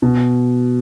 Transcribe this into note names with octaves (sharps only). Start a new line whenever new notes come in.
B2